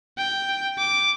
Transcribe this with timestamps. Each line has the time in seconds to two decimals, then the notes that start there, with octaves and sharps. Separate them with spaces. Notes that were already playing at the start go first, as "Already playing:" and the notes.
0.18 G5
0.78 D6